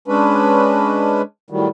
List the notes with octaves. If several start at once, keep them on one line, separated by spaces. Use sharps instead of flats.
G#3 C#4 D4 B4
A2 D#3 F#3 G3